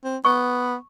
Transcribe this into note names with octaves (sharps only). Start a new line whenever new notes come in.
C4
B3 C#6